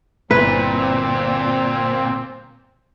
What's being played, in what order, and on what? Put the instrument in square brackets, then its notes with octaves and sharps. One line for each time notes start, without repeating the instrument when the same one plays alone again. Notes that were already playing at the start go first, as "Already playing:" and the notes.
[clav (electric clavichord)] G1 E4 C5 [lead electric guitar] A#2 [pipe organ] C4 [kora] B4